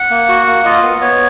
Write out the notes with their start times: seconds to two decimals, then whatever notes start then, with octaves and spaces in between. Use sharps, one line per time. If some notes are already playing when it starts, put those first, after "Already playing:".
Already playing: F#5
0.11 A#3
0.28 F#4
0.47 A#3
0.65 F4 D#5
0.83 B3
1.01 B3 C#5